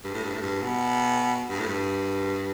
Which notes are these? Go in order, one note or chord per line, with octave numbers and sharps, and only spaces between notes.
G2
A2
G2
A2
G2
B2
G2
A2
G2